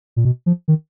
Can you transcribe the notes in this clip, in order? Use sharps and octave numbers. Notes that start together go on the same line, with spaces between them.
A#2
B2
F3
D#3